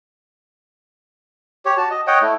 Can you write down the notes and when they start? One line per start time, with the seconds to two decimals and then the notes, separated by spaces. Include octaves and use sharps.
1.65 G4 C#5
1.77 F#4 A5
1.90 D#5
2.07 C#5 D#5 F#5 G5
2.22 A3 E4